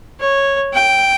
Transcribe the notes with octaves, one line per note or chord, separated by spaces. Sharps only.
C#5
G5